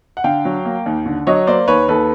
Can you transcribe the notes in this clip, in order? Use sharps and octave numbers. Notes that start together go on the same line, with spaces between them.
F#5
D3 F5 G5
F#3
A#3
D#2
D3
F#3 C#5 D#5
A#3 C5 D5
D#2 B4 C#5
D#2 A4 B4